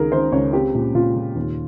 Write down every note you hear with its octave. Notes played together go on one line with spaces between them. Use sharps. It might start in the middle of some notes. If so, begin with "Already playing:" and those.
Already playing: C#2 D#3 G#4 A#4
D#3 C5
C#2 C#5
C4 G4
A#2
A#2 F4
A#2
D#2